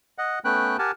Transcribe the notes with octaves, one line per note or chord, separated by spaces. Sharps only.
D#5 F#5
A3 B3 C#4 B4 G5 F#6
G4 A#4 F#5 G#5 A5